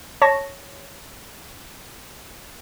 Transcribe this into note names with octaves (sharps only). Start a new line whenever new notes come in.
C#5 A5 C#6 A#6